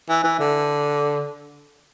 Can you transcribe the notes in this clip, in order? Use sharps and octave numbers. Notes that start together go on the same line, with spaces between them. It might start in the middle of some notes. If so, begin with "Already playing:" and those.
E3
E3
D3